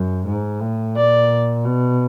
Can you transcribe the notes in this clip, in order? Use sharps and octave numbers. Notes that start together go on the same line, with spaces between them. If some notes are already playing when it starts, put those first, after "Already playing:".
Already playing: F#2
G#2
A2
A#2 D5
B2